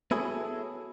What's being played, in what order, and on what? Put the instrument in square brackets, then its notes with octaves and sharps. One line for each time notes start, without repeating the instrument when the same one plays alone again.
[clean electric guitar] B3 E4 F#4 G#4 A4 C#5